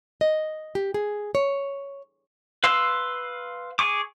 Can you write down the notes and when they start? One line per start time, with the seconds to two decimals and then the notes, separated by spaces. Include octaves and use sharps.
0.21 D#5
0.75 G4
0.94 G#4
1.35 C#5
2.64 B4 F5 C6 E6
3.79 G#4 C#6 D6